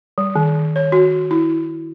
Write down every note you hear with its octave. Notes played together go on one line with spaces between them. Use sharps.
G3
D#3
C#5
F#4
E4